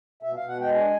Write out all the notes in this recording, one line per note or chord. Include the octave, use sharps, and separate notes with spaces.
B2 E5
B2 F5
F#5
G#3 G5
D4 G#5